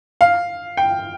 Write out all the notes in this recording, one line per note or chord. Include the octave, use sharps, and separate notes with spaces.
F5
G5